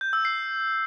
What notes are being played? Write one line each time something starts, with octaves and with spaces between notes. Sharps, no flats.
G6
E6
C7